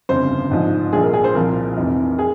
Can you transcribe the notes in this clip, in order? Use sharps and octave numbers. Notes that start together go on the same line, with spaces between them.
G1 F2 C#3 C5
A#1 G#2 F3
A#1 A#2 F3 G#4
A#4
G#4
C5
C2 A#2 F3 A#4
F1 F2 C3 E3
G#4